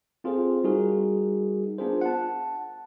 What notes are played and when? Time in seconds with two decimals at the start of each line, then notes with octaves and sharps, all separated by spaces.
0.24 C4 F4 G#4 A4 C5
0.64 G3 D#4 F#4 G#4 A#4
1.79 B3 D4 F4 G#4 A#4 C5
2.01 F#5 A5